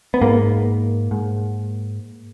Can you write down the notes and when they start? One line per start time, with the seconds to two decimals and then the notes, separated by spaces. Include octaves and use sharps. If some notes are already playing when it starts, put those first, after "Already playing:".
0.14 B3
0.22 G#2 A#3
1.11 G#2